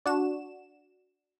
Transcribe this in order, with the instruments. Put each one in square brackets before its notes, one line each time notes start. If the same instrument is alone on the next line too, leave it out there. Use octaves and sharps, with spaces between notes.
[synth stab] D4 F#4 E7